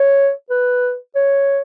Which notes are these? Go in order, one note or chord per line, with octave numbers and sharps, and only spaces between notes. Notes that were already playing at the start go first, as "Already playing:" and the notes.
Already playing: C#5
B4
C#5